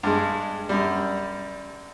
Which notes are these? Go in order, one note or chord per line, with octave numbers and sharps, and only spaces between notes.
G2 G#3
F#2 G3